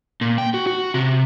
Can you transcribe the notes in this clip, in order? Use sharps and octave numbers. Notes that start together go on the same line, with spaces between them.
A#2
G5
F#4
F#4
C3